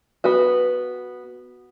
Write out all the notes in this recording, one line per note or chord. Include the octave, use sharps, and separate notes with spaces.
B3 F#4